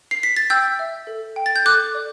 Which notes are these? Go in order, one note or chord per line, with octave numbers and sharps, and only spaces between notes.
C7
B6
A6
G5 E6 G6
E5
A4
G5
A6
G6
A4 D6 F#6
D5